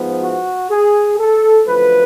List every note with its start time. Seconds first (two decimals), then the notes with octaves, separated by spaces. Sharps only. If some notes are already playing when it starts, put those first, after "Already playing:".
Already playing: G#2 F3 B3
0.21 F#4
0.70 G#4
1.18 A4
1.66 F#2 D3 F3 A3 B4